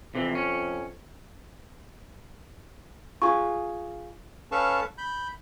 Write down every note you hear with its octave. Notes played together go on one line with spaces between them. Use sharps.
F2 C3 E3
C#4
F4 G#4 C#6
C#4 A4 B4 F5 A5 C#6
B5 G6